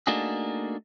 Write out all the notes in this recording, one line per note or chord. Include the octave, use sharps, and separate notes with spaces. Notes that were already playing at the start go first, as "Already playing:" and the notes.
A3 A#3 D4 D#4 F#4 G#4